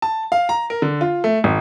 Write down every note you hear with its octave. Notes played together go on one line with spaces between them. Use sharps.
A5
F5
A#5
A#4
D3
F4
A3
G#1